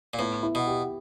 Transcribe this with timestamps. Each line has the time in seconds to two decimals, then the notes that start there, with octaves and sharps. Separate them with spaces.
0.14 A#2
0.19 A2 B3
0.43 E4
0.55 B2
0.67 G4